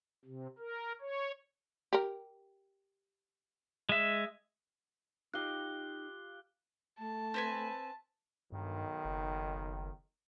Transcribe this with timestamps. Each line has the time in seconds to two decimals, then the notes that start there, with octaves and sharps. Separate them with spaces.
0.25 C3
0.59 A#4
1.01 C#5
1.93 G4 A#4
3.89 G#3 E5
5.34 D#4 F4 G4 D#5 F5 F#6 G7
6.99 A3 A5
7.34 C4 B4 G#5
8.52 B1 G2 D#3
9.05 F#1